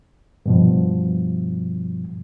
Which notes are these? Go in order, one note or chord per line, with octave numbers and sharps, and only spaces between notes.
G2 B2 F3